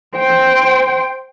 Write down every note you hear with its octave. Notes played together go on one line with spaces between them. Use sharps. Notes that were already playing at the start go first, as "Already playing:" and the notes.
C5 G5